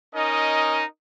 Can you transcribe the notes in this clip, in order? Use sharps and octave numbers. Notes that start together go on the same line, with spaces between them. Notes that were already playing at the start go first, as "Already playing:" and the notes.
C#4 D#4 A#4 D#5